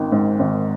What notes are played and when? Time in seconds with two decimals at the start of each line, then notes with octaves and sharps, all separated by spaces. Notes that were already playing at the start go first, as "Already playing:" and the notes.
Already playing: G#1 D#3
0.12 G#2
0.39 G#1